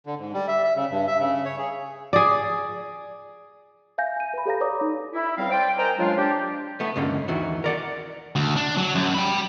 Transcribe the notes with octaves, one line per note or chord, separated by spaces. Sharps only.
D3
G#2
G3
E5
E5
C#3
G2
E5
C#3
C#5
G#4
G#4 D5
E5 F5 G#5 G6 A#6
G#5 D#7
B4 B5
G4 A4 C#5 F5 A#5 A#6
B4 C#5 D5 A#5 D6 D#6
D#4
E4
C#2 G3 C4 F5
C5 D5 G5
A#4 C5 D#5 G5 G#5 A#5
C#3 F#3 G#3 D4 F4
D4 G4
A3 B3
C#2 G2 D3 A#3 C#4
D#2 D#3 E3 F#4
A#4 D5 F#5
D2
D4
F#3
F#2
G5 B5